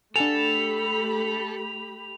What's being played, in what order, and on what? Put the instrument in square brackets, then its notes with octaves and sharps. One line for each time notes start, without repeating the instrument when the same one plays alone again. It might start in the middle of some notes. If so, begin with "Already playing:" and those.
[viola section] A3 G4 B5 [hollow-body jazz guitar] D4 F#5 G#5 [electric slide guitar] A4 [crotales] F7